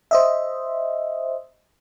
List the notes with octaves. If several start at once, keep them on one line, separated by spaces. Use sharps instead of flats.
C5 D#5 E5